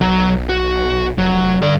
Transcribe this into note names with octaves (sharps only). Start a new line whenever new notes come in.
B1 F#3 A#5
F#4
F1 F#3
G2 D3 D5